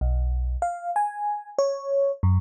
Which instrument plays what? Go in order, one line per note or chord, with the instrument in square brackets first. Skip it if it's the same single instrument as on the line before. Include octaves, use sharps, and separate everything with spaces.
[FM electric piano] B1
F5
G#5
C#5
F#2